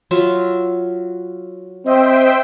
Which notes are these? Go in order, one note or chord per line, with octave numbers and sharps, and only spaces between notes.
F#3 F4 E5
C4 C5 D#5 E5 G5